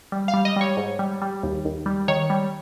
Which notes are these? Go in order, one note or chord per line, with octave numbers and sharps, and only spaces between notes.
G3
F5
G3
D#5
G3 C#5
G#2
G3
G3
D#2
D#2
G3
D#3 C#5
G3